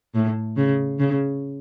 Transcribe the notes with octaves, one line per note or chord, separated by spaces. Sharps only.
A2
C#3
C#3